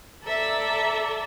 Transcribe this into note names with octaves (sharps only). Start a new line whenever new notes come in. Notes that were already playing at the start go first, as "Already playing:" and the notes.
A4 D5 E5 A#5